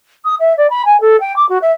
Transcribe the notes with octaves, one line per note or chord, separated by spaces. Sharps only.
D#6
E5
D5
B5
G#5
A4
G5
D6
F#4
E5